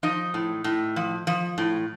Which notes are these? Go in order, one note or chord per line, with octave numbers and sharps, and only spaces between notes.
F3 D#4 D#5
A2
A2
F3
F3
A2